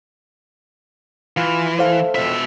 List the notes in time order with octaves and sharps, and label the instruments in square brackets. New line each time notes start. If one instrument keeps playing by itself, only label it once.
[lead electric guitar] E3 [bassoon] F4
[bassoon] A3 [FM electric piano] C5 F5
[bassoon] F2 [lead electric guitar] B2 E5